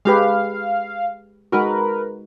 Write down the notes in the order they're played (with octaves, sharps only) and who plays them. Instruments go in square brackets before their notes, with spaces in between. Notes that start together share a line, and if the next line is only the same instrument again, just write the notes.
[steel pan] G#3 G4 B4 [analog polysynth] F5
[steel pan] G#3 D#4 F#4 [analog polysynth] A#4 B4